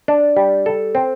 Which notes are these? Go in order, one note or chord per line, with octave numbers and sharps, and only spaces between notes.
D4
G3
A4
C4